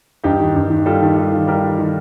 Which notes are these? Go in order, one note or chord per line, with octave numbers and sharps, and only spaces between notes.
G2 D#4 G4
D#3
G2
D#3
G3 F4 A4
D#3
G3
D#3
G3 G4 A#4
D#3
D#3